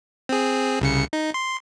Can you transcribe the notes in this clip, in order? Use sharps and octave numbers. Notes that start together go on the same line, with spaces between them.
C4 G#4
C2 C#3 C#7
D#4
C6